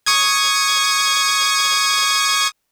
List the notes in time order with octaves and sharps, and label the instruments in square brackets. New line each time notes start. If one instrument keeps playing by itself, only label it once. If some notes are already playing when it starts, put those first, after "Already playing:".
[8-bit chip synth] C#6 D#6 G#6